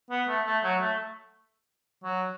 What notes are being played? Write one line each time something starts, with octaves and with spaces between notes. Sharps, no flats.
B3
A3
A3
F#3
A3
F#3